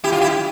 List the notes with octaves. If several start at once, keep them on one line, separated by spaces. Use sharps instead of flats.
E4 G4
F4
E4 G4